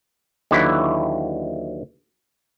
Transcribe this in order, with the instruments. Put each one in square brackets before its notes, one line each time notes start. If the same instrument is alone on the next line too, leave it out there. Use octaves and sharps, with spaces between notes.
[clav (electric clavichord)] D#2 D3 E3 F#3 E4